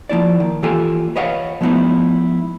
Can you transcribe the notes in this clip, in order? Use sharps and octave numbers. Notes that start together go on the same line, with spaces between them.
F3 A#3 E4 D5
D#3
E3 A#3 F4 G4 A4 G#5
B4 C#5 D#5 F5 F#5
F3 G#3 A3 B3 D#4 E4